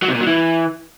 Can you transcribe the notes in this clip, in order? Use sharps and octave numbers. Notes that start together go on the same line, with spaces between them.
F#3
C3
A#2
F#3
E3